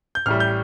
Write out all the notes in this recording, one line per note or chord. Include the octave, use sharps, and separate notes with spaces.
G6
A1 A2 G3 F6
G6